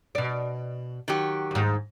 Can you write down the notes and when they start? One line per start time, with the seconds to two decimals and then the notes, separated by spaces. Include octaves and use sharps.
0.15 B2 D5
1.08 D#3 F#3 G4
1.51 D#2 G#2